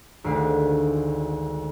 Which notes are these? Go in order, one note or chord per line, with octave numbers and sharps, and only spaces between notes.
G#1 D2 D#3 F5